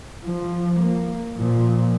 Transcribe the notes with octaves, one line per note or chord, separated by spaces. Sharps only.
F3
A#3
A#2 F3